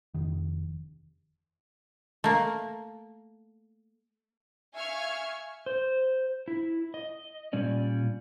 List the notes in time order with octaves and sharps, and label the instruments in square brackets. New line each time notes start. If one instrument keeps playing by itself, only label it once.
[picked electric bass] F1 F2 D#3
[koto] A3 A#3
[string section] E5 F5 G#5 C#6 F6 G#6
[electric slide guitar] C5
E4
D#5
A#2 G3 C#4 D5